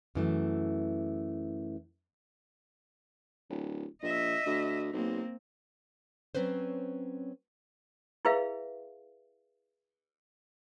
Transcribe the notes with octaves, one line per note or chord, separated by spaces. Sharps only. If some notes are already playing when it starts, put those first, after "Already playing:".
F#2 E3 A3
D1
A#1 D#5 E5
D2
B1 A#3 C4
F#3 C4 C#4 B4 C5
E4 G#4 B4 E5 F5